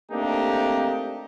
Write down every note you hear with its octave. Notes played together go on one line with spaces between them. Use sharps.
A3 A#3 C4 D4 D#4 G4